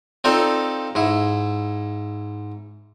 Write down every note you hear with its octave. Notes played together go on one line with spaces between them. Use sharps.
C4 D#4 F4 A4 D5
G#2 E4